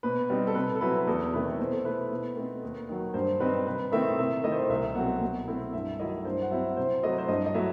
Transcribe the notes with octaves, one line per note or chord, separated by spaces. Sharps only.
B2 B4
G3 C4 D#4
A4
C3 B4
A4
F#3 C4 E4 B4
E2 A4
C3 D#3 A3 E4 B4
B4
B2 C5
A4
A3 E4 B4
B2
A3 C4 D#4
D#2
D#3 F#3
G2 C5
D#3 G3 C4 D#4 B4
C3 B4
D#3 A3 C4 E4 E5
C3 E5
D#3 A3 E4 D#5
C5
D#5
C2 E5
B2 F#3 A3 C4 F#5
B2
A3 C4 E4
G2 E5
D#3 F#3 A3 E4 D#5
G2 C5
F#5
F#3 C4 E4 E5
C3 C5
F#3 A3 E4 D#5
C5
G2 D#5
D#5
F#3 A3 E4 E5